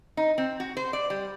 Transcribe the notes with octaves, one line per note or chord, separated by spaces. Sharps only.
D#4
C4
F#4
C5
D5
G3